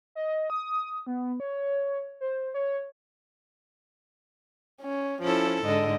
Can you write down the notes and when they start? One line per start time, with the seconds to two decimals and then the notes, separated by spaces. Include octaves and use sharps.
0.15 D#5
0.50 D#6
1.07 B3
1.40 C#5
2.21 C5
2.54 C#5
4.82 C#4
5.22 F3 C#4 E4 A4
5.65 G#2 D3 D#5